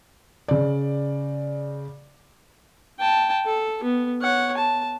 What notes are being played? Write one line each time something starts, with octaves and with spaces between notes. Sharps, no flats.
C#3 D5
G5 A5
A4
B3
C#5 F#5
A5